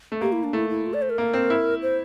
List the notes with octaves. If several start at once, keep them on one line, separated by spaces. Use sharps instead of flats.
A3
A#3 G4
E4
D4
A3 E4
E4
F4
D5
C5
A#4
A#3
C4
E4
C5